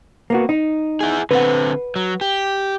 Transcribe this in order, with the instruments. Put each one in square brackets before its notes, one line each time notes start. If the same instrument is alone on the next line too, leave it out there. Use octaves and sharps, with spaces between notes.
[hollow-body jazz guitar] A#3 B3 F#4
D#4
[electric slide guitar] E4 G#4
[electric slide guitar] D3 C4 [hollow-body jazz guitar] B4 F#5
[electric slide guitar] F#3
G4